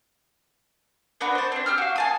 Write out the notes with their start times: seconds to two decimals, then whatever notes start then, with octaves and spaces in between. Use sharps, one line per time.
1.21 B3 D4 F#4 B4
1.35 C5 A5
1.52 C4 D4
1.66 G4 E6 F6
1.78 F#4 F5
1.96 G#5 A5 D#6